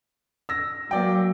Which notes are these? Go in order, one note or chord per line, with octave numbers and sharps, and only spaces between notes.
E6 A#6
F#3 A#3 D5 G5